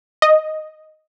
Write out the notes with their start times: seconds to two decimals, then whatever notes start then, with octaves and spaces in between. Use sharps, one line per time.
0.22 D#5